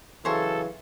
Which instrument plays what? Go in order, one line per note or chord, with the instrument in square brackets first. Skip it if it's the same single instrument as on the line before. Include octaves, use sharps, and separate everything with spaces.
[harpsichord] C#3 F#3 C#4 [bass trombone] E3 [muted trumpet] A4 [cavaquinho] C5 G#5 C#6